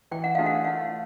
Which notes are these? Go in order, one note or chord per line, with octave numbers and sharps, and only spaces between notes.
E3 G5
F#5
A3 D4 F4 G#4 F5
F#5
A3 F5